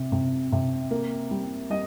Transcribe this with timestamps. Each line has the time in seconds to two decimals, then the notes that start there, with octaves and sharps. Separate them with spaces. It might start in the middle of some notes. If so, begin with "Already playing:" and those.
Already playing: C3
0.12 C3
0.52 C3
0.91 A#3
1.31 G3
1.70 G3 D#5